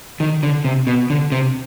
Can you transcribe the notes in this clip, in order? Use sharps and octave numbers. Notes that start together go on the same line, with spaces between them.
D#3
D3
C3
B2
D3
C3